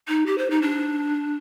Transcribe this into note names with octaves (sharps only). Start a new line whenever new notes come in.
D#4
G4
C5
D#4
D4